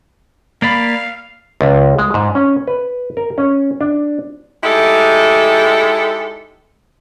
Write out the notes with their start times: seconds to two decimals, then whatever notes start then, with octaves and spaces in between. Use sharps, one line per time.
0.62 A#3 D5 F5 B5
1.61 C#2
1.99 G#3
2.14 G#2
2.35 C#4
2.67 B4
3.17 A#4
3.38 C#4
3.81 D4
4.64 G#3 D#4 E4 G4 A4